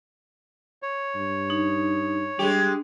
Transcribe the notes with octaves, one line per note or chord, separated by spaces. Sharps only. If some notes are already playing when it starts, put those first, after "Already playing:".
C#5
G2
D#4
G3 G#3 D4 G4